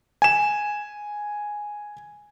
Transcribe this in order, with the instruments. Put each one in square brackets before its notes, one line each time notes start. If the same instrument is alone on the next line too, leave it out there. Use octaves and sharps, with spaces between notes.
[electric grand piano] G#5 E7